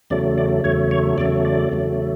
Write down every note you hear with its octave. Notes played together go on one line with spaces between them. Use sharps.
E2 C#3 F#3 A3 D5
D5
E2 C#3 F#3 A3 C#5
C#5
E2 C#3 F#3 A3 D5
D5
E2 C#3 F#3 A3